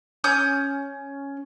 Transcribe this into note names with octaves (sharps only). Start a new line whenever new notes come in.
C#4 D#6 G6